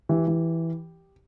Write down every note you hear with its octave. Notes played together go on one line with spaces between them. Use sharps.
E3 G4
E3